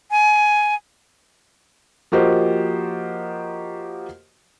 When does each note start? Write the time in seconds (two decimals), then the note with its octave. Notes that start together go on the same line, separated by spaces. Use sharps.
0.11 G#5
2.12 F3 A#3 F#4 G4 C5 D#5